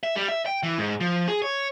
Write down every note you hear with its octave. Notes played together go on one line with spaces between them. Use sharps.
E5
G3
E5
G5
E3
G#2
F3
G#4
C#5